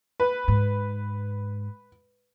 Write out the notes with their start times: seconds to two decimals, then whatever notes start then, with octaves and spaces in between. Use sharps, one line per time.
0.20 B4
0.48 G#2